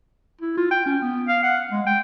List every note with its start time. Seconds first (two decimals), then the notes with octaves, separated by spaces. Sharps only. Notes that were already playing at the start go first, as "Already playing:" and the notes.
0.41 E4
0.57 F4
0.71 G5
0.86 C#4
1.02 B3
1.28 F5
1.43 F#5
1.71 G#3
1.86 G5